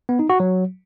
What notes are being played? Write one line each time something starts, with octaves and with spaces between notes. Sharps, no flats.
B3
D#4
F#4
F#3